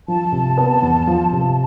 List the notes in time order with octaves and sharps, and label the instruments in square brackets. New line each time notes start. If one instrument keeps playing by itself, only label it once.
[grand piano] F3 [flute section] A5
[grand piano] C3
B3
E2
F3
C3